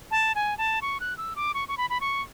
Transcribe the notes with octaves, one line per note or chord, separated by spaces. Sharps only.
A5
G#5
A5
C#6
F#6
E6
D6
C#6
C#6
B5
B5
C#6